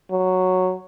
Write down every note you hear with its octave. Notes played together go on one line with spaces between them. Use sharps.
F#3